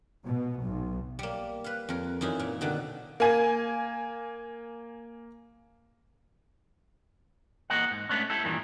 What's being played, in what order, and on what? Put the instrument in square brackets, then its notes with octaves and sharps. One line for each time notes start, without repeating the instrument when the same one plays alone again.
[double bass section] B2
B1
[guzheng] G3 A#3
B4 F5
F2 A#4
F#2 E3 D#4 E4 F5
A#2
B2 D3 D#3
[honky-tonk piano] A#3 G#5
[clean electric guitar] E2 A#3 D#5 F#5
G#2
G#2 A3 B3 C#4 D4
E4 G4 A4
E2 G2 A#2 D#3 E3